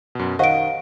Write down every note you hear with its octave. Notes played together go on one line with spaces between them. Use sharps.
F#2 B2
D#3 G4 C5 D#5 F5 F#5 D7